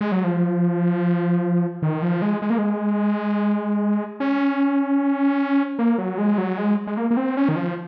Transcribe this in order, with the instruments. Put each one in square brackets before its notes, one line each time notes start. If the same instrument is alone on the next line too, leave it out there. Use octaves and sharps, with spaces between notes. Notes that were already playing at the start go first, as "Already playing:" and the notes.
[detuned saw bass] G#3
F#3
F3
D#3
F3
G#3
G#3
A#3
G#3
C#4
A#3
F#3
G#3
F#3
G#3
G#3
A#3
A#3
C4
C#4
D#3
F3